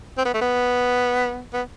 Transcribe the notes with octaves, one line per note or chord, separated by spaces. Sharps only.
C4
B3
A3
B3
B3